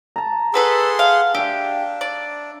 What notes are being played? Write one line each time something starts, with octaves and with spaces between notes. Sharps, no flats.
A5 A#5
G#4 A4 B4 F#5 C6 E6
F5
D4 G4 E5 F5
D5